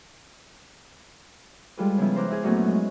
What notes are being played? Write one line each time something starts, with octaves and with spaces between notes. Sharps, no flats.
G3 G#3 F4 A4 B4
C#3 F3 B3 E4
C5 A#5 D6 F6 F#6
E4 G#4 A#4
F#2 A#2 F#3 A3 B3 C#4
G#3